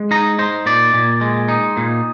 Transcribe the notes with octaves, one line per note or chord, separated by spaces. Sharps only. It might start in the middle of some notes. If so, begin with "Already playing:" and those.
Already playing: G#3
D#4 A#5
D#4 C5
A#2 D5
A#2
G#3
D#4
A#2